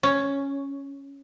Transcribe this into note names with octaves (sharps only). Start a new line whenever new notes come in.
C#4